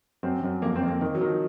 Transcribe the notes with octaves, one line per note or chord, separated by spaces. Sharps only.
F#2 C4
F#2
F2 A#3
C4
F2
A#3
D#3
F#3
D#3
F3